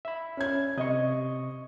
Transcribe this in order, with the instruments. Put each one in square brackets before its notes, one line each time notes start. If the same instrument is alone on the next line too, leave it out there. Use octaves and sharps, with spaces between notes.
[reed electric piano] E5 B5
[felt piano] C#4 G#6
[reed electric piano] C3 C#6 [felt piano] D#5